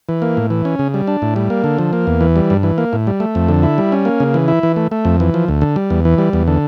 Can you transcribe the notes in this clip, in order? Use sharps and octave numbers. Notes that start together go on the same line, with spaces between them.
E3
A#3
A2
E3
C#4
C#3
G3
D4
A2
G3
A#3
D3
F3
A#3
E2
E3
G3
G2
E3
A#3
A2
G3
A3
F2
D3
E4
G3
C#4
A#3
C#3
E3
E4
E3
A3
A3
F2
E3
F3
D2
D3
G3
E2
E3
G3
E2
D3